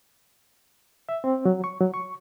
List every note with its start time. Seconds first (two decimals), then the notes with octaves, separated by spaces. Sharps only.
1.09 E5
1.24 C4
1.45 F#3
1.64 C#6
1.81 F#3
1.94 C#6